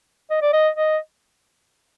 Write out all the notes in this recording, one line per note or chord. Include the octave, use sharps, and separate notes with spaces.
D#5
D5
D#5
D#5